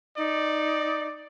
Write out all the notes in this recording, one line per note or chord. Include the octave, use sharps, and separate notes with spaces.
D#4 D5